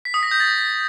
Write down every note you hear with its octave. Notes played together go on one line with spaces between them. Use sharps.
B6
D#6
A#6
G6
A6